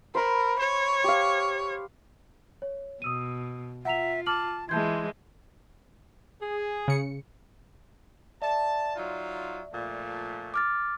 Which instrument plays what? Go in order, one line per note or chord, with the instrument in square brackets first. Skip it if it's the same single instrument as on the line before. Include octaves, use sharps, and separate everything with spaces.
[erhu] A#4 [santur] C5 B5
[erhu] C#5
[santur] G4 F5
[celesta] C#5
[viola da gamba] B2 [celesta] D#6 E6 D#7
[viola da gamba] F4 [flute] E5 [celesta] F#5 A#5 F7
[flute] A5 [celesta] D6 F6 F#7
[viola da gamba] E3 G#3 [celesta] A5 G6 G#6 [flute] C6
[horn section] G#4
[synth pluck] C#3 C#7
[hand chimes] D5 E5 [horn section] A5
[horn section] F#3 D#4 F4
A#2 F3 A3
[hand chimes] D6 F6 A6